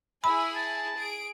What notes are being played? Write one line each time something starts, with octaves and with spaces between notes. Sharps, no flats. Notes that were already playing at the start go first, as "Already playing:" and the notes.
E4 G#4 E5 G#5 B5
A5
G#4 D7